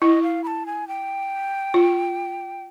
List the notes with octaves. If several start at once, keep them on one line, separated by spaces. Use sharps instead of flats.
E4 D#5
F5
B5
A5
G#5
G5
F4